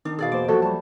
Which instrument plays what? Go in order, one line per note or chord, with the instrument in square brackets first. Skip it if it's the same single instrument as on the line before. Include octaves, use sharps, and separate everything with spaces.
[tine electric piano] D#3 [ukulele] D4
[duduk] B2 [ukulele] G#4 D5 F5
[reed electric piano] E2 A#3 C5 [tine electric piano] D6
[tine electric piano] F3 F#3 A3 [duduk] F#4 [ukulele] A4
[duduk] G3 [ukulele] A5